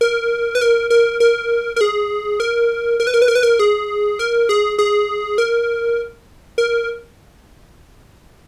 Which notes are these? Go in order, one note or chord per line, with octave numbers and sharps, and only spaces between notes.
A#4
B4
A#4
A#4
A#4
A#4
G#4
A#4
A#4
B4
A#4
B4
A#4
B4
A#4
G#4
A#4
G#4
G#4
A#4
A#4